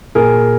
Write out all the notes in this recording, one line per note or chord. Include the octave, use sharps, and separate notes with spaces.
A#2 G#4 A#4